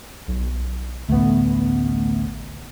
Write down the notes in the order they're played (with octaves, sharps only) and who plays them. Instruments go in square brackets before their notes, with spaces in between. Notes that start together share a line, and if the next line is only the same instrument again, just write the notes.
[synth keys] B1
[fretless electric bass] A1 D2 [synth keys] A3 B3